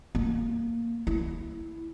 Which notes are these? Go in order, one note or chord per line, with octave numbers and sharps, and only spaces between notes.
A#3
E4